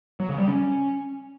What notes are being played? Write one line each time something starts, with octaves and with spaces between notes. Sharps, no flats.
F#3
C#3
G3
C#4